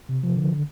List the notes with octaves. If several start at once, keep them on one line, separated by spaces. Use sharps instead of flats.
C3
F3
D3
D3